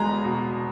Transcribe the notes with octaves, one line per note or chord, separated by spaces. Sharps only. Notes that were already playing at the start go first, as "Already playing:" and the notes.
Already playing: E2 G#3 B3 A#5
B2